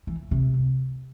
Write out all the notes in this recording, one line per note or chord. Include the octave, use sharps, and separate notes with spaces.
E3
C3